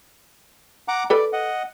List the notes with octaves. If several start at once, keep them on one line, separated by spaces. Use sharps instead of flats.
F#5 A#5 D6
A4 B4 D5 B5
D#5 F#5